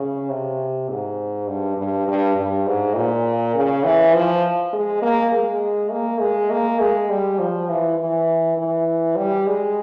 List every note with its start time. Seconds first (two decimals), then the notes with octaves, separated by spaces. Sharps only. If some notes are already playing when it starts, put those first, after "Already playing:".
Already playing: C#3
0.29 C3
0.89 G#2
1.47 G2
1.77 G2
2.07 G2
2.36 G2
2.66 G#2
2.95 A#2
3.55 C#3
3.84 E3
4.14 F3
4.73 G#3
5.02 A#3
5.32 G#3
5.91 A#3
6.21 G#3
6.50 A#3
6.79 G#3
7.09 G3
7.39 F3
7.69 E3
7.98 E3
8.57 E3
9.16 G3
9.47 G#3